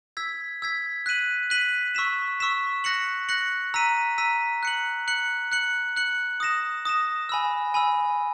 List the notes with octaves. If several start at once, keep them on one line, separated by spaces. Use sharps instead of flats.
E6 G#6 B6
E6 G#6 B6
F#6 B6 D#7 F#7
F#6 B6 D#7 F#7
C#6 E6 B6 E7
C#6 E6 B6 E7
F#6 A#6 C#7 F#7
F#6 A#6 C#7 F#7
A#5 E6 B6 D#7
A#5 E6 B6 D#7
F#6 C#7 F#7
F#6 C#7 F#7
F#6 C#7 F#7
F#6 C#7 F#7
D#6 A#6 E7
D#6 A#6 E7
G#5 B5 E6
G#5 B5 E6